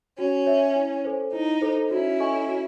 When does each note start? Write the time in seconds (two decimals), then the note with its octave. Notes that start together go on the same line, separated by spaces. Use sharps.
0.18 C#4 F#4
0.46 C#5 E5
0.76 E4
1.04 A4 C5
1.32 D#4 E4
1.61 A4 C5
1.90 C#4 E4 F#4
2.19 A4 D#5 G#5 C#6
2.48 F#4